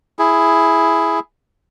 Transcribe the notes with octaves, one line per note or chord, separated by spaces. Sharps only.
E4 G#4